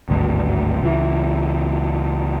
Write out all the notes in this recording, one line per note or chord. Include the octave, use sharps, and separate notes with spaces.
G#1 D2 G2
C#2 E3